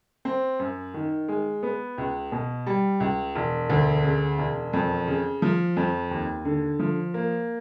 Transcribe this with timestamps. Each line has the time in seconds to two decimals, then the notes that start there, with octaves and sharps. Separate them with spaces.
0.25 C4
0.59 F#2
0.94 D#3
1.28 G#3
1.63 B3
1.98 C#2
2.32 B2
2.66 G3
3.00 C#2
3.35 E1
3.70 D2
4.04 C#3
4.38 E1
4.73 F2
5.07 C#3
5.42 F3
5.77 F2
6.11 D#2
6.45 D3
6.79 F3
7.14 A#3